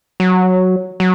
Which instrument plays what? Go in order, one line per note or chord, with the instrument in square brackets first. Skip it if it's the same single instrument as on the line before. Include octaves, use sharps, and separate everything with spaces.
[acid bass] F#3
F#3